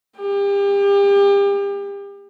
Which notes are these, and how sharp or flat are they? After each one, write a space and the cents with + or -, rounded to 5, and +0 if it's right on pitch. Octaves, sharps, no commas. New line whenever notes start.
G4 +35